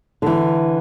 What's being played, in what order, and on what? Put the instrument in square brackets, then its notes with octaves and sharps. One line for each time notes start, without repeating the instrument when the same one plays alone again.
[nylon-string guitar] D3 E3